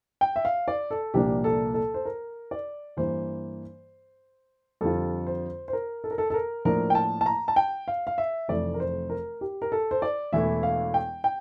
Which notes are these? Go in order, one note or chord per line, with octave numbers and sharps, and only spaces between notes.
G5
E5
F5
D5
A4
C2 A#2 F3 A#3 D4 G4
A4
A4
C5
A#4
D5
G2 E3 A#3 C5
F2 D3 G3 C4 F4 A4
C5
C5
A#4
A4
A#4
A4
A4
A#4
A2 F3 A#3 D4 A#4
G5
A5
A5
A#5
A5
G5
F5
F5
E5
F1 F2 E3 A3 D5
A#4
C5
A#4
G4
A#4
A4
C5
D5
E1 E2 E3 A3 E4 E5
F5
G5
G5